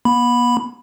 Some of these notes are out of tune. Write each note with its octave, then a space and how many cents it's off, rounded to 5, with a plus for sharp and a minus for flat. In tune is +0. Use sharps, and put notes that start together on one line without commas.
B3 -45 B5 +0